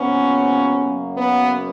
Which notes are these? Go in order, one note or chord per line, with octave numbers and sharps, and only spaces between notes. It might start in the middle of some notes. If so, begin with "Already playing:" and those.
Already playing: C3 F3 A#3 B3 C#4
F#2 C#3 F#3 A#3
B3